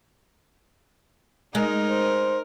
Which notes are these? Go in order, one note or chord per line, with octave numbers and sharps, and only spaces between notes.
G#3 D#4 A#4
C5